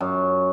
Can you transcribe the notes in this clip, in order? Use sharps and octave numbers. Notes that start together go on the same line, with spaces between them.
F#2